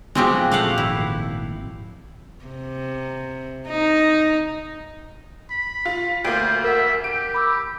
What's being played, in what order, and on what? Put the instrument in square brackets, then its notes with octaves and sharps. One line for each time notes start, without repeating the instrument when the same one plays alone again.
[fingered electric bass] A1 B3 [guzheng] F2 F#3 F#4 [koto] G#3 C4 G4
[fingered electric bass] A#2 F3 [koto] A3 [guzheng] G4 F5 F#5
[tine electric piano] G#1 [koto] E4
[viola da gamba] C3
D#4
[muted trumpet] B5
[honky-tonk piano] F4
[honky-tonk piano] D2 A#3 [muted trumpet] C5 [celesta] D7
[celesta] A#4 F#5 [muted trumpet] E5
[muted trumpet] G4 [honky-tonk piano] D7
[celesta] B5 D6 E6